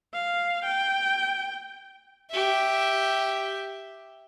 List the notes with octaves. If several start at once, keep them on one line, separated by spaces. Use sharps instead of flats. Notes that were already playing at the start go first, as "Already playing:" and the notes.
F5
G5
G4 E5